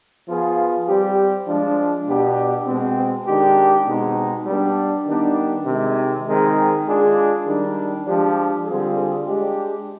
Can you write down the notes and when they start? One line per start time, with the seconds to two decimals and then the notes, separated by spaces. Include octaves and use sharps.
0.27 F3 B3 F4 G#4
0.87 G3 C4 G4
1.46 F3 G#3 D4
2.06 B2 B3 D4 G4
2.67 B2 G#3 C4
3.27 D#3 G#3 D4 G4
3.87 B2 G#3 C4 D#4
4.46 G3 B3 D4
5.06 D#3 G3 B3 D4 G4
5.66 C3 D#3 G#3
6.26 D#3 G#3 C4 D#4 G#4
6.86 G#3 D4 F4 G#4
7.46 D#3 G3 D4
8.05 F3 G#3 D4 G4
8.65 D3 G3 C4 F4 G#4
9.26 G#3 D4 G4